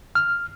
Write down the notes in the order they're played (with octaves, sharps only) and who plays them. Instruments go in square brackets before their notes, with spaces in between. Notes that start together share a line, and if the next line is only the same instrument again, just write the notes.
[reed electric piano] F6